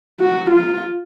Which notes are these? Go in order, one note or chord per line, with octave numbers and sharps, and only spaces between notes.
F#4
F4